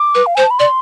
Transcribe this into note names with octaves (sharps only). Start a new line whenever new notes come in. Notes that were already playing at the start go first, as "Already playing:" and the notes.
Already playing: D6
B4
F5
C5 G#5
A5
B5
D5 C6